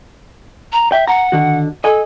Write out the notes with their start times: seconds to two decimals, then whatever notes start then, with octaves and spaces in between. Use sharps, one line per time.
0.73 A#5
0.92 E5 G5
1.07 F#5 A#5
1.32 D3 D#3 F#4
1.84 A4 D#5 G#5